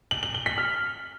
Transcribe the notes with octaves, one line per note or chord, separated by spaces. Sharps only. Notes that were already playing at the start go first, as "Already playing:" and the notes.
F#7
F#7
G7
B6
F6